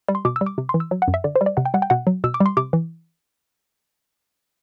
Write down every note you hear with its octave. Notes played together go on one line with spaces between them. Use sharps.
G3
C6
B2 D6
E6
G3
D6
C3
C6
E3
E6
F#3
F#5
F#2
E5
D3 D5
C5
G3
D5
C3 F#5
G5
G3 F#5
G5
B2 F#5
F#3
B2 E6
D6
G3
C6
C3 D6
E3